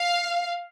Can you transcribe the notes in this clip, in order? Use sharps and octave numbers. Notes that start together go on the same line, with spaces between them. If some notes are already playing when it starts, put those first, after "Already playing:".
Already playing: F5